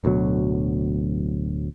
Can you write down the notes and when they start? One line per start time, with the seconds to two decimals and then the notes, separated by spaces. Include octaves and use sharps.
0.04 D1 D2 B2 F#3